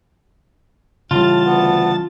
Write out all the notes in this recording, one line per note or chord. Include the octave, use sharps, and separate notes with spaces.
A2 C#3 E3 G3 F4 A5
D2 B3